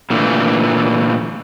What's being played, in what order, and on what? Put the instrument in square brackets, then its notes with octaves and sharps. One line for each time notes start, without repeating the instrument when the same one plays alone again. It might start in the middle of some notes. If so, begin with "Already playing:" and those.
[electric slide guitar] A#2 D3 E3 A3 A#3